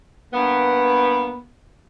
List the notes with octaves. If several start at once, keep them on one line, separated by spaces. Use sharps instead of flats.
G2 A#3 B3